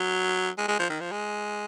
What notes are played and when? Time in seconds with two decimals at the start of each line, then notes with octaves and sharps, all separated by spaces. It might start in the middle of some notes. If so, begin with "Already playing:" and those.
Already playing: F#3
0.58 G#3
0.68 G#3
0.79 F3
0.90 D#3
1.00 F3
1.12 G#3